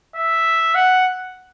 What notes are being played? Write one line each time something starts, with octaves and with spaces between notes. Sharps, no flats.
E5
F#5